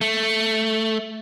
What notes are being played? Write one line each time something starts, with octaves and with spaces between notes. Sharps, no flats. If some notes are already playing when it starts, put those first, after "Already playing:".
A3